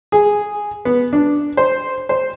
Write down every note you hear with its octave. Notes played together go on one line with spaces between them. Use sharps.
G#4
B3
D4
C5
C5